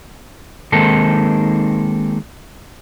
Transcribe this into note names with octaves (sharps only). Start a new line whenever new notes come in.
D#3 G#3 A#3 C4 D#4 A4